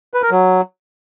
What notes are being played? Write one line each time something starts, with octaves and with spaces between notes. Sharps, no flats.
B4
A#4
F#3